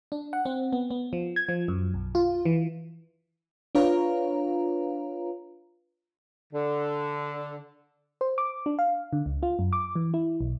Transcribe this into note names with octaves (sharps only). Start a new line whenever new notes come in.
D4
F#5
C4
B3
B3
F3
G#6
F3
F#2
B1
F4
E3
D4 F4 B4 C#5 F5 A#5
D3
C5
D6
D4
F5
D3
C#2
F4
F#2
D6
E3
E4
B1